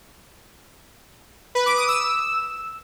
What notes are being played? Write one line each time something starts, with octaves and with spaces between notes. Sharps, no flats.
B4
D6
D#6
E6